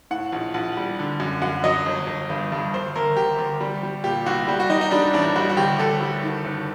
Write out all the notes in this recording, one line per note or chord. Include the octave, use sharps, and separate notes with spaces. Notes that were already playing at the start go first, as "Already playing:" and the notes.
A2 F#5
A#1
A#1 F#5
G3
D3
F#2
F#2 F#5
F#3 D#5
G1
G1
G2
G2
D2 C5
D2 A#4
D2 G4
D2
G3
G3
A#2 G4
C2 F#4
G3 G4
F#4
G3 D#4
D#4
G3 D4
A1 D4
G3 F#4
F#4
D2 G4
D2 A4
G3
D#3
F#1